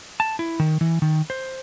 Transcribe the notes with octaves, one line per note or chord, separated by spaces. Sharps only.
A5
E4
D#3
E3
D#3
C5